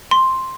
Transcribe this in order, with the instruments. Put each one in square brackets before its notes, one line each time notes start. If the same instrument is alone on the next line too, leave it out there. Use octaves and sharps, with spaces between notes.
[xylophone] C6